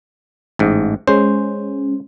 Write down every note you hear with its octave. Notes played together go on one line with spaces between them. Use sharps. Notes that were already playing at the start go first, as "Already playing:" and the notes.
A1 G#2
G#3 C#4 C5